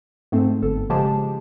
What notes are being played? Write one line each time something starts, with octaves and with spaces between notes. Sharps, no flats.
G#2 A3 C4
G1 A4
C#3 F3 G#3 G4 A5